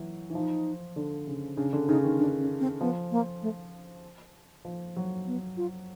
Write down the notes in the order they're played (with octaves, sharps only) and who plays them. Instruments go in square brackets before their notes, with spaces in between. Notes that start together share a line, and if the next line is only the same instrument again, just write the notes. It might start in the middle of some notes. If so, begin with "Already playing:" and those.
Already playing: [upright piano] E3 F#3
E3
[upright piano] F3 [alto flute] D#4
[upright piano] D3
C#3
[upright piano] C#3 [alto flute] D4
[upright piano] D3
[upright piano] C#3 [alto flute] D#4
[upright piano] D#3
[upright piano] D#3 [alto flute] D4
[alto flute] C#4
C4
[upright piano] F3 [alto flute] B3
[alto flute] A#3
A3
[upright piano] F3
F#3
[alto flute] B3
F4